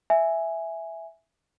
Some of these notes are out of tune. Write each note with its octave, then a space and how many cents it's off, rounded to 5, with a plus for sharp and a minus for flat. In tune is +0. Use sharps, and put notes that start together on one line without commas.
E5 +0 G#5 +0